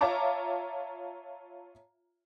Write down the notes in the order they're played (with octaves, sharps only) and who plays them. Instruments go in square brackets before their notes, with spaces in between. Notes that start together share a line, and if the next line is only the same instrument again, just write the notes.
[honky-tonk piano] F4 C#5 E5 A5 A#5 D6